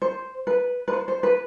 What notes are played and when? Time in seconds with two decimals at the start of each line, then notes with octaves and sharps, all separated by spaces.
0.02 C5
0.47 B4
0.88 B4
0.93 C5
1.08 C5
1.23 B4